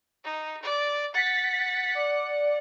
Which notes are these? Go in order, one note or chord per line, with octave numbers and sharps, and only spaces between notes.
D#4
D5
F#5 A6 B6
D5